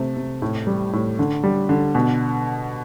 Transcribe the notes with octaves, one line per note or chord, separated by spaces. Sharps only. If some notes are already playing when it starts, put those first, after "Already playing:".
Already playing: C3 A3
C3
A2
G3
A2
D3
G3
D3
B2